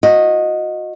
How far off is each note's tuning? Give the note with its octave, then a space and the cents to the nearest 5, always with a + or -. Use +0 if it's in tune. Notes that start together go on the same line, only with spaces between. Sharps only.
F#4 -30 D#5 +0